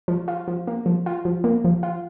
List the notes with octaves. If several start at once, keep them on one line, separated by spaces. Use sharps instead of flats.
F3
F4
F3
A#3
F3
F4
F3
A#3
F3
F4